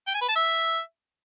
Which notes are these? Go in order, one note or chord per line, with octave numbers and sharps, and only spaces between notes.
G5
G#5
B4
A5
E5